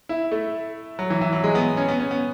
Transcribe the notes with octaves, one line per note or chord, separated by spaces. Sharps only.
E4
A3
F#3
E3
E3
F#3
G#3
B3
C#4
B3
C#4
B3